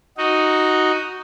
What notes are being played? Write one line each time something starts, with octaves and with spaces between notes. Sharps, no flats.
D#4 F#4